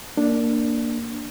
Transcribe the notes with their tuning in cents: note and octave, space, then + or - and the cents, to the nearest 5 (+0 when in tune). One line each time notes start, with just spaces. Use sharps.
A#3 +0 D4 +0